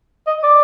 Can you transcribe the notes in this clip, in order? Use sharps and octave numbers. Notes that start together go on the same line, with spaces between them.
D#5
D5